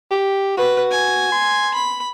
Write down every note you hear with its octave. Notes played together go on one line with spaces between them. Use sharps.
G4
F#4 B4
G#5
C6
B5